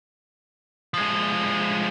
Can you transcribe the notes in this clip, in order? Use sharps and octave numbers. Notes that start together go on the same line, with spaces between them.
F3 G#3